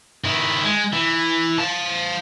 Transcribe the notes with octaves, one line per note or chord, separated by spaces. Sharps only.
D#3 E4
G#3
E3
F5 A5